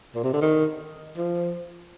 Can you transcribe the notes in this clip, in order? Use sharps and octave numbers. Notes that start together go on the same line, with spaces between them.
A#2
C3
D3
D#3
F3